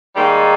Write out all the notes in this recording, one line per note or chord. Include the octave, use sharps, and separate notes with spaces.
G#2 D#3 G3 A#3 D#4 G5